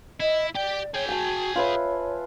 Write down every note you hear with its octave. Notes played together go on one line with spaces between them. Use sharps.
E4 D#5
G4 D5 G5
G#4 C#5 G5
F#4 G#5 A5
F4 B4 C#5 E5